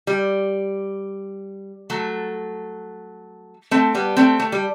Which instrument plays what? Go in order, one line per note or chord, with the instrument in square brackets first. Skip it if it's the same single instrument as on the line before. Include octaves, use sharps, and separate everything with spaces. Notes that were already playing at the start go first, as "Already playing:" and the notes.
[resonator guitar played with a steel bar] G3
F#3 A3
A3 C4
G3 B3
A3 C4
A3
G3